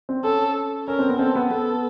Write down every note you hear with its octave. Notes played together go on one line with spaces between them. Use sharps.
C4
C#4 A4
C#4 A#4
C4
B3
C4 A4
B3
B3 A4